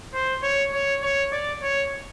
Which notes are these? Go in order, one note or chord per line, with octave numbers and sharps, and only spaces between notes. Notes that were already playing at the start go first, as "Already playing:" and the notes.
C5
C#5
C#5
C#5
D5
C#5